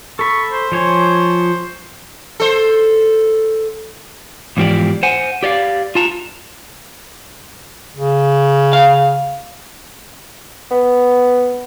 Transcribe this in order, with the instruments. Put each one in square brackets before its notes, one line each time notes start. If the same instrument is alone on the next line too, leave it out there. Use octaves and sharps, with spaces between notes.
[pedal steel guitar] A4 B5 [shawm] C#6
[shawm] C5
[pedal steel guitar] F3 C#5 G#5
[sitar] A4 C5
[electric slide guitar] E2 G#2 E3 F3 G4 D5
C5 F#5 G#5
G4 D5 D#5 F5
F4 A5 A#5
[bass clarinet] C#3
[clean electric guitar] F5
[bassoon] B3